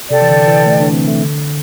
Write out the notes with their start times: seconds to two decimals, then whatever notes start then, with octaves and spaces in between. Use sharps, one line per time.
0.10 C3 A4 D5 G5
0.22 E3
0.29 D3
0.47 E3
0.66 A3
0.80 D4
0.93 C4
1.07 A3
1.22 D3